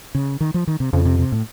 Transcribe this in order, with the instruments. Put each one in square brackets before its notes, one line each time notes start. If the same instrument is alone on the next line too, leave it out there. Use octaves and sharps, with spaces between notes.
[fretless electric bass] C#3
D#3
F3
D#3
C3
[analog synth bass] F2 [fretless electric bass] C#3
[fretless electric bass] C3
C3
A2